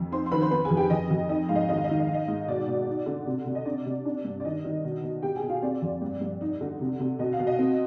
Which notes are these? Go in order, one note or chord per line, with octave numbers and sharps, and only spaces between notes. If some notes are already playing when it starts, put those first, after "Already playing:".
Already playing: F2
D#4 C5 C6
C6
D#3 B4 B5
C5 C6
B3 B4 B5
G#4 G#5
F2
G4 G5
F2 D#5
F2
D#4 D#5
G#2 F5
D#5
D#3 D#5
F5
D#5
D#3 F5
D#5
D#4 F5
D#5
G#2
B2 D5
B2
D#4
D3
C3
C3
D#5
D4 D5
C3
D4
G2
D5
D#3 D#5
D#3
B2
B2
B2 G4 G5
G#4 G#5
B2
F4 F5
C4 D5
F2
G2
G2
D#4
D3
C3
C3
B2 D#5
F5
B2
D#5
C4